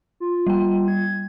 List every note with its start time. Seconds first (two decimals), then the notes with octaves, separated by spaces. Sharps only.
0.20 F4
0.47 G3 G5
0.88 G#6